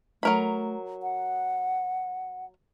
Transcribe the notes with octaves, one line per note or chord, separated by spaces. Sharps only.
F#3 A3 A#4 B5
F#5